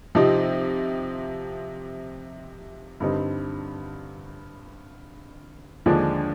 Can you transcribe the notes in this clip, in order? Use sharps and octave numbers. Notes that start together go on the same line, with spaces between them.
C3 F3 C4 D#4 G4
G2 D3 G3 C4 D#4
D#2 D3 F3 G#3 D4